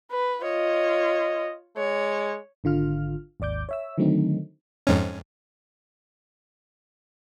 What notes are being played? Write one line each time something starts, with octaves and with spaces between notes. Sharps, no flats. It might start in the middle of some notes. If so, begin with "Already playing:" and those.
B4
F4 C#5 D#5
G#3 C#5
G#1 D3 F4 F6
G#1 D#2 D5 D6 G6
C#5 E5 E6
D3 D#3 F#3 A3 C4 D#4
F2 G#2 C#4